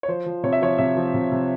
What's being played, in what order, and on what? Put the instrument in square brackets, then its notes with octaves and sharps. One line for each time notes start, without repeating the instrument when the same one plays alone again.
[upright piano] C#5
F3 C5
F3
C3 C#5
E5
F3 C#5
C3 E5
F3
C3
C3